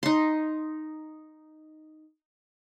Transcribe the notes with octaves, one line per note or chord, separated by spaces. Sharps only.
D#4 C6